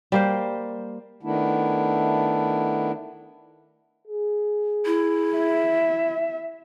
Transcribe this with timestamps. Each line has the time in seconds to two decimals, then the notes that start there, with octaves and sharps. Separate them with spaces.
0.12 G3 A#3 C5
1.23 D#3 A3 B3 D4 E4
4.08 G#4
4.86 E4
5.36 E5